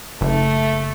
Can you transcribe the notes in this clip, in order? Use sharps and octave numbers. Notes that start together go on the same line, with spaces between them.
F#1 A3